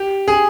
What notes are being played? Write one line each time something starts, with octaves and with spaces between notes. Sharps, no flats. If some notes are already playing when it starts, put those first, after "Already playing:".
Already playing: G4
G#4